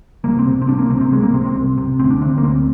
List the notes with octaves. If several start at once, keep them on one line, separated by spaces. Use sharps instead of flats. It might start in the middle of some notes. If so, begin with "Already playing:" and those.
C2 A#3
C4
C3
C4
C2 D4
A#3
C3 C4
C4
C2 G#3
A#3
C3 C4
C4
C2
C3
D2 C4
D4
D3 C4
A#3
D2 C4